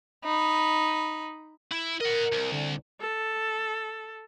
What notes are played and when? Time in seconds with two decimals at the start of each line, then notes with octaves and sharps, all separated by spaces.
0.25 D#4 B5
1.71 E4
2.01 A#4 D#5 F#5
2.32 C2
2.52 D3
3.01 A4